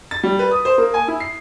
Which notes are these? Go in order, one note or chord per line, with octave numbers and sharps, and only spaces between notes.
A6
G3
B4
D#6
C5
A#3
G#5
E4
C7